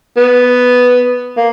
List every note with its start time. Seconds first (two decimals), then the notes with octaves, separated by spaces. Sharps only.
0.17 B3
1.37 A#3